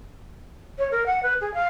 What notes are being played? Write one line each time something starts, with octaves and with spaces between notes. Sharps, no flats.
C#5
A#4
F#5
B4
G#4
F5